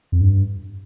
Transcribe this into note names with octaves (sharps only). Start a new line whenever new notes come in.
F2
G2